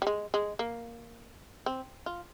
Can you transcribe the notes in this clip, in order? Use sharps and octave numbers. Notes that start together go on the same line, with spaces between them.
G3
G#3
G#3
A#3
C4
F4